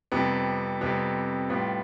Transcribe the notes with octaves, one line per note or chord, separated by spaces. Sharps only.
F2 C3 G3 B3
F2 C3 G3 B3
A2 G3 B3 F4